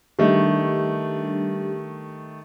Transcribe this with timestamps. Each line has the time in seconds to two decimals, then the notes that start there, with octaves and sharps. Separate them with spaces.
0.19 D#3 G3 A3 D4 G4